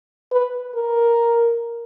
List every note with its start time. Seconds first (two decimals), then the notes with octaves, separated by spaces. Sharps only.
0.32 B4
0.75 A#4